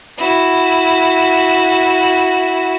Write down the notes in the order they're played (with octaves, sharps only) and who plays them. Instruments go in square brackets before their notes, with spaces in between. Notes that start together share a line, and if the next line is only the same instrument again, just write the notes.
[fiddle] E4 F#4